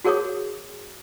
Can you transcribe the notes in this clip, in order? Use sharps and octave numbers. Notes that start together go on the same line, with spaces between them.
F#4 G#4 A#4 C#5 D6 D#6